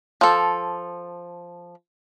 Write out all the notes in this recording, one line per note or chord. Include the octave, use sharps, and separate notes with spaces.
F3 A4